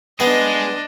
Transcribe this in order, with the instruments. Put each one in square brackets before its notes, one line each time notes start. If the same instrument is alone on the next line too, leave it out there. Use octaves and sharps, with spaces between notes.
[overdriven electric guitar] G#3 [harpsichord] B3 [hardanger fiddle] D4 D#5